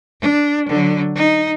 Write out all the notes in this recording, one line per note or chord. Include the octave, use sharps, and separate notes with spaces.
D4
D3 F#3
D#4